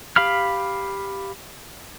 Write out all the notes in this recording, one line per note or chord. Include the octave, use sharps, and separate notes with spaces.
G4 F5 B5 F6